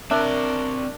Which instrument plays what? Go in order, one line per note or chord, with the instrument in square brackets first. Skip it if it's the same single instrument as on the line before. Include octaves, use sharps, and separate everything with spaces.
[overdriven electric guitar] C4 D5 [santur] D4 [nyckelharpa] A#4 [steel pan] E5